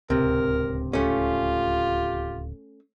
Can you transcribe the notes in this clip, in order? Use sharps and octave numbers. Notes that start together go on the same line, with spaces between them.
D1 C#2 C3 A#4
A3 C#4 F4 G4